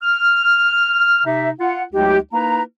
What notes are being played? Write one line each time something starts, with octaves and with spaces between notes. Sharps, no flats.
F6
C3 D#4 E5
F4 F#5
D2 F#3 G#3 D#4 G4
A#3 D#4 E4 B4 A#5